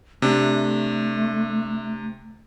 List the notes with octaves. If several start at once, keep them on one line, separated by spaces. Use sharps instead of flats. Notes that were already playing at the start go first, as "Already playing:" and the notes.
C3 A3 D4